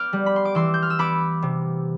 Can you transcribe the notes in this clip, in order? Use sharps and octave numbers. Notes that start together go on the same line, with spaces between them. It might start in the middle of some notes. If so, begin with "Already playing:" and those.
Already playing: B3 D6 F6 G6
G3
B5
C6
D6
E3 C6 E6
G6
F6
E6
B3 B5 D6
C3